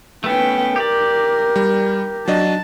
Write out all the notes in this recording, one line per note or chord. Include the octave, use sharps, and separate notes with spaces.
A3 B3 C#4 B4 G5
G4 A#4 D5
G3
F#3 D4 D#5 A5